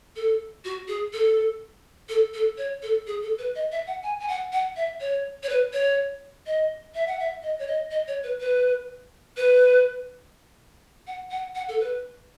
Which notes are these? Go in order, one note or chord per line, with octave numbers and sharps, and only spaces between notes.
A4
F#4
G#4
A4
A4
A4
C#5
A4
G#4
A4
B4
D#5
E5
F#5
G#5
G#5
F#5
F#5
E5
C#5
C#5
B4
C#5
D#5
E5
F#5
E5
D#5
C#5
D#5
D#5
C#5
B4
B4
B4
F#5
F#5
F#5
A4
B4